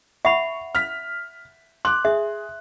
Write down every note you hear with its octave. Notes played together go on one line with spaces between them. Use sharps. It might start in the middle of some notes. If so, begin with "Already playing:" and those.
E5 F#5 B5 C#6
F6 B6
C6 D6 F#6
G#4 E5